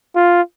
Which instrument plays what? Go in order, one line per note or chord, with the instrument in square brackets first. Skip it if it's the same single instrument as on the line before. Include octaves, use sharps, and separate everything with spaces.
[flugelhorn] F4